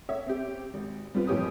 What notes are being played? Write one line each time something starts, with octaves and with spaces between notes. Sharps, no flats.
C#5 E5
C4 G4
G#1
G3 C4 F4 B4
F2 E3 A#3 G4 C#5 D#6